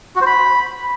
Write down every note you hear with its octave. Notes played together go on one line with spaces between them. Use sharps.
F#4
C5
B5